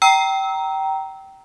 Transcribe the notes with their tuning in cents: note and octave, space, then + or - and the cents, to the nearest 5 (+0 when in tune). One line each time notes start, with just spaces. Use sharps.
G5 -20 A#5 +0 E6 -25